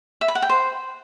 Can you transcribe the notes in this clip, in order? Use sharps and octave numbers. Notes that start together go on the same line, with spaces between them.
E5
B5
F#5
G5
C5